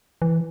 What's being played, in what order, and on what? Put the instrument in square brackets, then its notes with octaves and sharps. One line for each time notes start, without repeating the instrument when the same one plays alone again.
[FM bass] E3